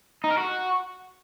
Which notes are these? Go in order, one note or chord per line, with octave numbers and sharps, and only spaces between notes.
D#4
A#4
F#4